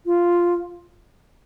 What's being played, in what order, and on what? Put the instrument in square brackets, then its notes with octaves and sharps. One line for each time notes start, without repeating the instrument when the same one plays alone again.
[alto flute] F4